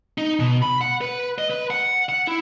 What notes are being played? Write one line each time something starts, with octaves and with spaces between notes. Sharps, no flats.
D#4
B2
B5
F#5
B4
D#5
B4
F#5
F#5
E4